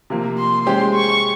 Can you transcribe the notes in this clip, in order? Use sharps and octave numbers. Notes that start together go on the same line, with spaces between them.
C3 F3 A#3
C6
G#3 C#4 G4 C5 C6
C#6